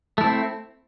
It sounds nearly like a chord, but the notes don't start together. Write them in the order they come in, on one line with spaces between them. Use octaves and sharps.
A3 E4 C4